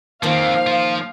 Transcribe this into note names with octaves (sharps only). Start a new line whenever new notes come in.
A#2 D#3 F3 A#3 C4 C5 F5
F3 F4